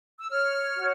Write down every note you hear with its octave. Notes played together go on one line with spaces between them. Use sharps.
E6
C#5 F6
F#4